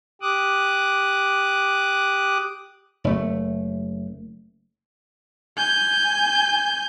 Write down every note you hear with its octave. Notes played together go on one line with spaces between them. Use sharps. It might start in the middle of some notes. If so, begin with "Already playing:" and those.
G4 D6 D#6 F#6
F#1 A3
G#5 G6